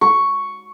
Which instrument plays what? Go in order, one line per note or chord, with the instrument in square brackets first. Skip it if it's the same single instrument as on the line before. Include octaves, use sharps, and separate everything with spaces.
[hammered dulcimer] C#6